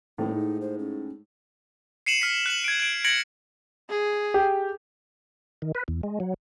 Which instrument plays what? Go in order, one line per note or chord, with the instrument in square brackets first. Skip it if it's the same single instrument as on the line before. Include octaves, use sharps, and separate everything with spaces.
[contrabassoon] D#1 [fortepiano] A2 [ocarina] D#4
[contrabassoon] G#2
[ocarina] C5
C#4
[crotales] C7 C#7 D#7 E7 F#7
F6 B6
F#6 C#7 E7 F#7
G#6 D7
G#6 D7
G#6 A#6 C#7 D7 F#7
[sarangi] G#4
[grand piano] G4
[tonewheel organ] D#3
B4
E2
G#3
F#3